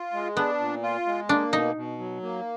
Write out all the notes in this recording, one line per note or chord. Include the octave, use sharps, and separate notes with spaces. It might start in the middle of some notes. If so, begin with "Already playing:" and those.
Already playing: F4
G#3
B3 D4
A#2
F4
G#3
A#3 D4
B2 D#4
B2
F#3
A#3